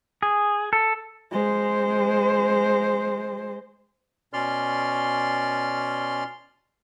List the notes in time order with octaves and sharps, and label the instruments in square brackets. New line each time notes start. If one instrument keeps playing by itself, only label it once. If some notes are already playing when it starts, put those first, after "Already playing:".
[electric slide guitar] G#4
A4
[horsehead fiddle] G#3 C5
[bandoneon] B2 C#4 D5 C6 F6